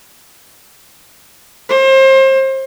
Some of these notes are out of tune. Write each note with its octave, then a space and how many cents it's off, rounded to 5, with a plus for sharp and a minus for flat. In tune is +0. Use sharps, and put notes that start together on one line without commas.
C5 +30